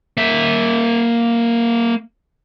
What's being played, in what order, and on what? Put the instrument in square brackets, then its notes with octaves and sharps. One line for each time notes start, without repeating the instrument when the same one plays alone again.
[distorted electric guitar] A#3 E5